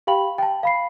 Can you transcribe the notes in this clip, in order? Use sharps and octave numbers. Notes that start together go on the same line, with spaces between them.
G4 F5 G5 B5 F#7
G5 A5
F5 B5 C7